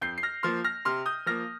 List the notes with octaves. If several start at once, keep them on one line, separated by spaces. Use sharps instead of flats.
F2 G6 C7
C7
F6 A#6
F3 A#3 C6 F6
F6 A#6
C3 C6 F6
D#6 G6
F3 A#3 F6 A#6